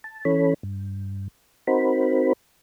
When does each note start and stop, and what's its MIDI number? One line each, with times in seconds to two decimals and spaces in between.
0.04 0.24 81
0.25 0.54 52
0.25 0.54 61
0.25 0.54 69
0.25 0.54 73
0.25 0.54 83
0.63 1.28 43
1.67 2.33 60
1.67 2.33 63
1.67 2.33 66
1.67 2.33 70
1.67 2.33 72
1.67 2.33 83